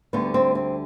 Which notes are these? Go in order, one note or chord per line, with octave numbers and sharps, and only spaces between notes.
D2 D3 G3 B3
C4
C4